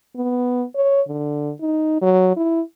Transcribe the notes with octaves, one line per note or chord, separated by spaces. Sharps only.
B3
C#5
D3
D#4
F#3
E4